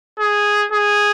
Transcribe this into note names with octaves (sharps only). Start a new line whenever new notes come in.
G#4
G#4